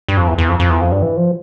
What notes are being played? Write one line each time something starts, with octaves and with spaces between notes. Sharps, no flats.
G2
F2
E2
E2
F2
F2
E2
F2
G2
E3
F3